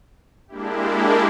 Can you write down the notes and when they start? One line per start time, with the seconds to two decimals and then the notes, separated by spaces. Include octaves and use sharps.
0.48 G#3 A#3 D4 E4 G4